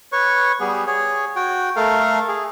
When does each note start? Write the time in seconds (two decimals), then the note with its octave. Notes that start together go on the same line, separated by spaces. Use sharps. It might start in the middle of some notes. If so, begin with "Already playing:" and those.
0.12 B4 C#5 C#6
0.60 G3 B3 G#4
0.87 G#4 C#5
1.36 F#4 G5
1.76 A3 A4 A#4 F5
2.28 G#4